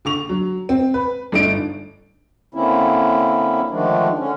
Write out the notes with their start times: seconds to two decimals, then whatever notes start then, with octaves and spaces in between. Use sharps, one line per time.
0.05 D3 C#6 F7
0.29 F#3
0.69 C4
0.94 B4
1.32 G1 A3 D4 D#4 D7
2.55 D3 A#3 C4 C#4 E4
3.70 D3 D#3 F3 G#3 A3 D4
4.19 D3 C#4